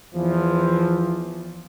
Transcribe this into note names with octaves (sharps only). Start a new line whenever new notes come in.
E2 E3 F3